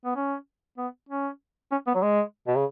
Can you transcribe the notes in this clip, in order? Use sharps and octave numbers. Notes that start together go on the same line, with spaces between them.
B3
C#4
B3
C#4
C#4
B3
F#3
G#3
B2
C#3